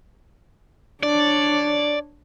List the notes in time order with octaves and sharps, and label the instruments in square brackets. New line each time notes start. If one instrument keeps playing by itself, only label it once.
[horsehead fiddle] D4 C#5 [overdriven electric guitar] D5